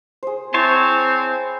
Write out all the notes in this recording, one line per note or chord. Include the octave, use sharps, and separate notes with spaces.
G#4 C5
C4 E4 C5 C#5 G#5 A5